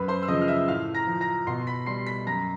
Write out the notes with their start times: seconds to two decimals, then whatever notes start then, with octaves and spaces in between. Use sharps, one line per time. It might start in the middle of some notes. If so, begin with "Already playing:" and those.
Already playing: F#2 B4 B5
0.08 C5 C6
0.23 E6
0.28 C#3 F3 D#5 D#6
0.41 F6
0.48 E5 E6
0.68 A2 F5 F6
0.95 A#5 A#6
1.07 F3
1.21 A#5 A#6
1.47 B2 C6 C7
1.67 B5 B6
1.86 G3 C6 C7
2.07 B5 B6
2.27 F#2 A#5 A#6